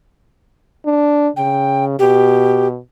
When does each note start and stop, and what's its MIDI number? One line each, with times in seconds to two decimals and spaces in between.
0.86 1.28 62
1.36 1.96 49
1.36 1.84 79
1.99 2.78 47
1.99 2.67 67